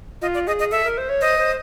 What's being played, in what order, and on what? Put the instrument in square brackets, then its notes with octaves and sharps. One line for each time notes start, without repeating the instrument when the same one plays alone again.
[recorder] F4 [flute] D#5
[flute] D5
[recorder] G#4 [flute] D#5
[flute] D#5
[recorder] A4 [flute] E5
[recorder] A#4
C5
C#5
[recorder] C5 [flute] D#5
[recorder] C5